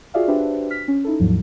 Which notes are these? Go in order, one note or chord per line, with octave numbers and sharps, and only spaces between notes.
F4 F#4 G#4 D5 E5 F5
D4 F#4 G4 B4 C5 E5
F6 B6
C#4
D#4 E4 A4
D#2 G#2 F3 F#3